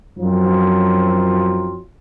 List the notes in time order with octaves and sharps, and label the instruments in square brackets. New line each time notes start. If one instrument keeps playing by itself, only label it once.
[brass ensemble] F#2 F3 F#3 C4 D#4 F4